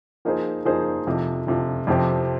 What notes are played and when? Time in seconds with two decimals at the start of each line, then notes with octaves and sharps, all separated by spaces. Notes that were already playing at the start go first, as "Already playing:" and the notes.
0.25 F3 A#3 D#4 G#4 C5
0.65 F3 A#3 D#4 G#4 C5
1.07 F2 C3 F3
1.47 F2 C3 F3
1.87 F2 C3 F3 C4 G4